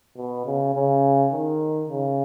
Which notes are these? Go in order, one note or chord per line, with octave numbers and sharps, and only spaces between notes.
B2
C#3
C#3
D#3
C#3